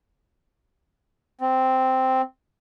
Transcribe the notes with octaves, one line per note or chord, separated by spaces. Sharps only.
C4